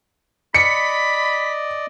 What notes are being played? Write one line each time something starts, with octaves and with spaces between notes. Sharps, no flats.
D5 D#5 B5 B6 C#7